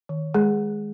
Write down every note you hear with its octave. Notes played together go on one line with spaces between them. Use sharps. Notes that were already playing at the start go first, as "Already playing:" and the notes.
D#3
G#3 G#4